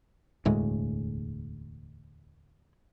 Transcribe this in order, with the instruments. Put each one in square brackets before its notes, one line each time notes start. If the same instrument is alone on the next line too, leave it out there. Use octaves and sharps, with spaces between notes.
[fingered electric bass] E1 D2 A2 G#3